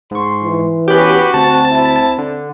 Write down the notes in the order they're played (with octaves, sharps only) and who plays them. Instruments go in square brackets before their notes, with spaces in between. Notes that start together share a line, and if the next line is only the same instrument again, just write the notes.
[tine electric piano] G#2 C#6 [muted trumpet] C6
[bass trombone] E3
[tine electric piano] B3 C#4 [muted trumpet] F#4 [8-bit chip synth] G4 B4
[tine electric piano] D2 [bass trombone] C4 [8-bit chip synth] A5
[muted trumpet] E4
[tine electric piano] D3